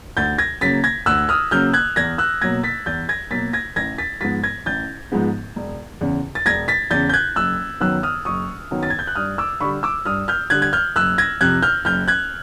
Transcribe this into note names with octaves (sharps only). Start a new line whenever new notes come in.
D2 G6 A6
G#6 A#6
C#3 F#3 A#3 A6 B6
G#6 A#6
D2 E6 F#6
D#6 F6
C#3 F#3 A#3 F6 G6
F#6 G#6
E2 G#6 A#6
E6 F#6
B2 F#3 A#3 G#6 A#6
A6 B6
E2 G6 A6
G#6 A#6
B2 F#3 A#3 A6 B6
G#6 A#6
A1 G#6 A#6
A6 B6
G#2 F3 G#3 B3 A6 B6
G#6 A#6
A1 G6 A6
G#2 F3 G#3 B3
E1
E2 C#3
A6
E1 G#6 A#6
A6 B6
E2 C#3 G6 A6
G6
F#6 G#6
F#1 E6 F#6
F#2 D#3 F#3 B3 E6 F#6
D#6 F6
F#1 C#6 D#6
F#2 D#3 F#3 B3
A6
G#6
G6
F#6
G2 D#6 F6
D6 E6
D3 G3 B5 C#6
D6 E6
G2 D#6 F6
F6 G6
D3 G3 F#6 G#6
G#6
F6 G6
F#1 E6 F#6
G#6 A#6
F2 C3 F#6 G#6
F6 G6
F#1 F6 G6
F#6 G#6